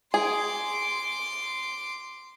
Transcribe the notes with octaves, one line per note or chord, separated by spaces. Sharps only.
G#4 C6 D6